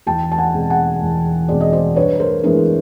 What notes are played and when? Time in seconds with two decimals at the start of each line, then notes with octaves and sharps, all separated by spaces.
0.07 E2 G5 A5
0.32 A5
0.38 F#5 G#5
0.54 B2 G#3 C4
0.70 F#5 G#5
1.01 E2
1.48 B2 G#3 C4 D5
1.61 D#5
1.72 C5 D5
1.96 G2 B4 C#5
2.19 A#4 C5
2.43 E3 G#3 B3 D4 G#4 A#4